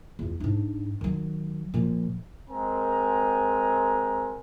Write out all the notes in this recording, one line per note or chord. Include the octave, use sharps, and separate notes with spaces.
E2 F4
G#2 D4
D#3 F#3
A#2 F3
G#3 C4 A#4 G#5 A#5